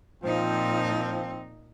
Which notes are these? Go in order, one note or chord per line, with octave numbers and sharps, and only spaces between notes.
A#2 F3 C4 D#4